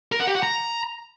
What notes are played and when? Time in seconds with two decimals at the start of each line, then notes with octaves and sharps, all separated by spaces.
0.12 A#4
0.20 F#5
0.27 G4
0.35 F#5
0.43 A#5